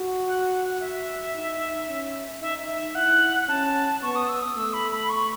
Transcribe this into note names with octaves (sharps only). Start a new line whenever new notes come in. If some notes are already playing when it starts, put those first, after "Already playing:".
Already playing: F#4
F#5
F#5
E5
D#4
C#4
D#4 E5
E5
E4 F#5
C#4 A5
B3 C#6
D#6
E6
D#6
A3 E6
B5
B5
C#6